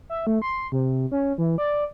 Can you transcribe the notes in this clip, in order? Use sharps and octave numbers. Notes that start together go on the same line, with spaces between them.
E5
A3
C6
C3
C#4
E3
D5